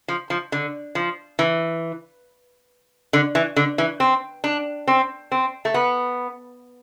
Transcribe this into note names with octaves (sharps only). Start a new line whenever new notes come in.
F3
F3
D3
F3
E3
D3
E3
D3
E3
C4
D4
C4
C4
A3
B3